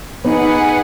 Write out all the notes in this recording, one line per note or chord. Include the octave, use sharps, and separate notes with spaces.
B3 D#4 G#4 B4 F#5